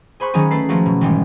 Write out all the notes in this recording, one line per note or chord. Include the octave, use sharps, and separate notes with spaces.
G#4 C5 B5 C#6 F#6
D#3 F#3 C#4 D#4 G#4
A3 A4 B4 C7
F3 A3 A#3 C#4 F#4
B2
G#1 E3 G3 G#3